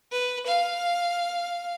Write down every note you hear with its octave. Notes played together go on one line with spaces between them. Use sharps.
B4
F5